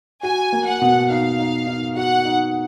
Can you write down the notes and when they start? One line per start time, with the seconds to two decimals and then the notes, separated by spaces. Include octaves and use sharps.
0.23 F#4 G#5
0.53 A#3
0.66 F#5
0.82 B2
1.10 D#4 F5
1.39 D#4
1.67 D#4
1.96 F#4 F#5
2.25 D#4